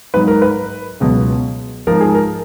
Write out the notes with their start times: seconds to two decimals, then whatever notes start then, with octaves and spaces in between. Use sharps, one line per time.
0.14 G#2 F#3 B4
0.28 A#4
0.42 B4
1.00 C#2 B2 F#3
1.87 G#2 F3 A#4
2.01 G#4
2.15 A#4